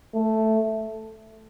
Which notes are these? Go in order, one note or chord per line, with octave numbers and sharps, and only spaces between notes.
A3